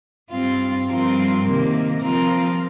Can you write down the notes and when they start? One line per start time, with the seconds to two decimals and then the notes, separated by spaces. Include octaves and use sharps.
0.30 G2 G3 C4 F4
0.87 G2 F3 C4 F4 A#4
1.44 C3 D#3 A#3
2.01 F3 C4 F4 A#4